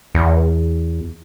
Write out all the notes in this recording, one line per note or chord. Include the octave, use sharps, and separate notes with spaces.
E2